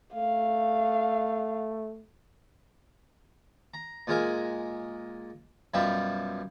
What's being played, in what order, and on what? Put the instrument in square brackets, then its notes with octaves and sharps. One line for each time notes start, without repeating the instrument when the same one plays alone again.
[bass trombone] A3 [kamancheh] F5
[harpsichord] A#5
A#2 G#3 A#4 G#5
F#2 B2 G3 F4 E5 G5